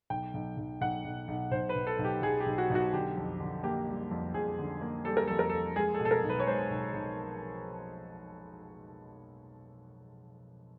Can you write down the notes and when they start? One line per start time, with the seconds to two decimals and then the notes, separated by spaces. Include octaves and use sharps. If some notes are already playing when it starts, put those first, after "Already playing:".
0.10 B1 G5
0.34 B1
0.57 B1
0.81 B1 F#5
1.05 B1
1.28 B1
1.51 B1 C5
1.69 B4
1.76 B1
1.87 A4
1.99 B1
2.04 G4
2.22 B1 G#4
2.40 G4
2.46 B1
2.58 F#4
2.70 B1
2.75 F#4
2.93 D3 G4
3.17 F2
3.40 D3
3.63 A#3 G4
3.88 G3
4.11 F2
4.34 F2 G#4
4.59 D3
4.81 A#3
5.05 G3 A4
5.17 A#4
5.27 F2 A4
5.39 A#4
5.49 F2 A4
5.76 G#3 G#4
5.94 A4
6.00 B2
6.05 A4
6.11 A#4
6.23 B1
6.30 B4
6.40 C#5
6.47 G#3 C5
6.71 B1
6.94 B1